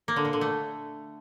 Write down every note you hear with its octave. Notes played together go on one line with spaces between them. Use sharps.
A#3
D3
A#2
D3
A3